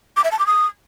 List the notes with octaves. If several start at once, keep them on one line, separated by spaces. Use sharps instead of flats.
D6
E5
A5
D6
D#6